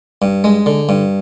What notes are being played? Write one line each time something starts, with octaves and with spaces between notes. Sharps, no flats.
G2
G#3
D3
G2